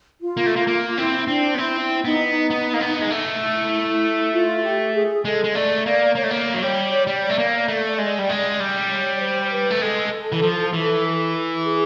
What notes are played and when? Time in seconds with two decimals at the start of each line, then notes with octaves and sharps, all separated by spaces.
0.21 F4
0.37 A#3
0.46 A3
0.56 A#3
0.67 A#3 F4
0.98 C4 E4
1.28 C4 D4
1.55 B3
1.58 C4 E4
1.81 E4
2.05 B3 D#4
2.27 D#4
2.50 B3
2.74 A#3
2.80 B3
3.01 G#3
3.11 A3
3.42 E4
4.33 F4
4.63 G4
4.94 G#4
5.25 G#3 A4
5.44 G#3
5.55 A3 D5
5.86 A#3 D5
6.15 A#3 C#5
6.23 A3
6.30 A#3
6.54 F#3
6.62 G3 C#5
7.07 G3 D5
7.30 A3
7.38 A#3
7.68 A3
7.98 G#3
8.19 G3
8.29 G#3
8.60 G3
8.90 C#5
9.20 C5
9.51 B4
9.70 A3
9.82 G#3 A4
10.32 E3
10.42 F3
10.73 E3
11.64 G#4